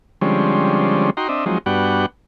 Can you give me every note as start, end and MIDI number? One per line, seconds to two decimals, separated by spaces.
0.21 1.10 50
0.21 1.10 53
0.21 1.10 55
0.21 1.10 56
0.21 1.10 60
0.21 1.10 61
1.17 1.28 63
1.17 1.28 66
1.17 1.28 79
1.17 1.28 82
1.17 1.28 84
1.29 1.45 60
1.29 1.45 62
1.29 1.45 75
1.29 1.45 76
1.46 1.58 53
1.46 1.58 54
1.46 1.58 56
1.46 1.58 60
1.46 1.58 63
1.66 2.06 43
1.66 2.06 59
1.66 2.06 62
1.66 2.06 66
1.66 2.06 78
1.66 2.06 79